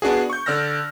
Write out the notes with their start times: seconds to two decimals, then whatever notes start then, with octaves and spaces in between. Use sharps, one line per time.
0.02 B3 D4 F#4 G#4
0.30 C#6 G6
0.46 D3 D5 E6 F6 A#6